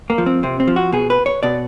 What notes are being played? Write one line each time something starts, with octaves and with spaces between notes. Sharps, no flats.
A#3
F3
C4
C3 C4
C4
F3
F#4
B2 G#4
B4
C#5
B2 D5